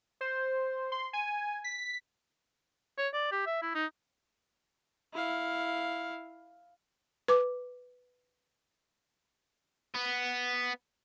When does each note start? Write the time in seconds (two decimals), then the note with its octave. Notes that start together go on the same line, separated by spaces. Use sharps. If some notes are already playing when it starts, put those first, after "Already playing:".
0.21 C5
0.92 C6
1.13 G#5
1.64 B6
2.98 C#5
3.14 D5
3.32 G4
3.46 E5
3.62 E4
3.75 D#4
5.13 E4 F5
7.28 B4 D6
9.95 B3